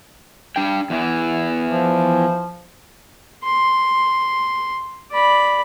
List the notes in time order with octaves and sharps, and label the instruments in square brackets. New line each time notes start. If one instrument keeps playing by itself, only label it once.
[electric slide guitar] D4 G5
E2 E3
[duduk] F3
[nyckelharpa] C6
D5 B5